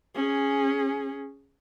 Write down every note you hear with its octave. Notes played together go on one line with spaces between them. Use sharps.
C#4 G#4